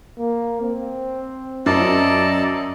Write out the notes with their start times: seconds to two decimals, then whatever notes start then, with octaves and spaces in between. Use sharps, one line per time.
0.19 A#3
0.61 C4
1.66 F#2 D5 D#5 A5